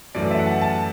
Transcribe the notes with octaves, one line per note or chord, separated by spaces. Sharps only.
F#2 E3 A3 D5
E5
F#5
A5
A5